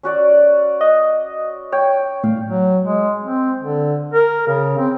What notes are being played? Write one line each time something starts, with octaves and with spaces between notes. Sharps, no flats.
C#4 F#4 D5
D#5
C#5 G5
A2 F5
F#3
G#3
C4
D3
A#4
C#3
C4